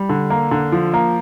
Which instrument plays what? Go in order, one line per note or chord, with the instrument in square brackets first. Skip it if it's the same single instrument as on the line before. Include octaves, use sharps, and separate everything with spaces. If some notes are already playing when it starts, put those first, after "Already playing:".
Already playing: [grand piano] G3
D3
A#3
D3
F3
A#3